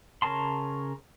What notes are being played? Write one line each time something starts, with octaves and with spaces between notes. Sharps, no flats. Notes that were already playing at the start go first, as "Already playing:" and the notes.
C#3 A#4 C#5 A5 C6